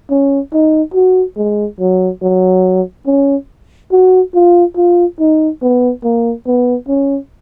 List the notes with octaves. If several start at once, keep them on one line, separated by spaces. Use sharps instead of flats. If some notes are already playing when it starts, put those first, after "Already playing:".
C#4
D#4
F#4
G#3
F#3
F#3
C#4
F#4
F4
F4
D#4
B3
A#3
B3
C#4